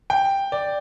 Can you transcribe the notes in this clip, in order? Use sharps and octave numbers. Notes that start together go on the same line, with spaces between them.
G5
D5